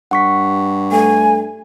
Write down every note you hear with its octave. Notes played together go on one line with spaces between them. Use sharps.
G2 F#5 C#6 B6
A3 G#5